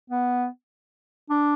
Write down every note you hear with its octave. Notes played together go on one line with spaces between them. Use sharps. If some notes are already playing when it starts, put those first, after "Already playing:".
B3
D4